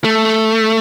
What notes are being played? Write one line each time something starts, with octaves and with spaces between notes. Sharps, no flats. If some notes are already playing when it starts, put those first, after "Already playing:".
A3